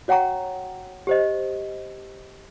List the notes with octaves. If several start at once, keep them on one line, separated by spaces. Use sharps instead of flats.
F#4 C#5 F#5 G5 A#5 C#6
G4 C5 D#5